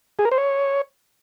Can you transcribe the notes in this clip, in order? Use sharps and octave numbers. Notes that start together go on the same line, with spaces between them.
G#4
A#4
C5
C#5